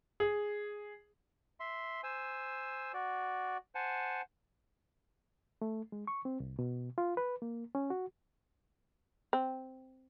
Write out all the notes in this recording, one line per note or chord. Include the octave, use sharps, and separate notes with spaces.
G#4
E5 C6
C5 G#5 E6
F#4 D5
C5 F#5 G#5 A5
A3
G#3
C#6
C4
C2
B2
F4
B4
A#3
C#4
F#4
C4